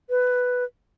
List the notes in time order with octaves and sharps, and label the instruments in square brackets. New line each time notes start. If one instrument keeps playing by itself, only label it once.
[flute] B4